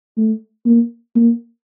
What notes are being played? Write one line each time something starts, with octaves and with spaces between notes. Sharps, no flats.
A3
A#3
A#3